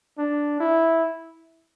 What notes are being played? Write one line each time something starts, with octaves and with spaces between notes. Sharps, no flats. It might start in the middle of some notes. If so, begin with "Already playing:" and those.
D4
E4